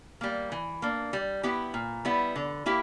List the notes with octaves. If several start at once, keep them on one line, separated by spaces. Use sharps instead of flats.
G3 A#3
E3
A#3 D4
G3
B3 E4 G4
A#2
G3 B3 E4
D3
A#3 E4 G4